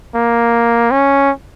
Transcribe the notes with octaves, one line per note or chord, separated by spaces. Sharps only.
A#3
C#4